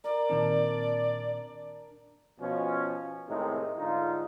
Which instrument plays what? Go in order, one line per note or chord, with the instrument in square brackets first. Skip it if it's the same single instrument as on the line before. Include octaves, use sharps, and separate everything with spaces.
[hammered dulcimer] A#4 [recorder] D5
[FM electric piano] A#2 D#3 C4 [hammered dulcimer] D4
[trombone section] B2 F3 C#4
C2 A2 C3 D#3 G#3 D#4
G#2 D3 D#4 F4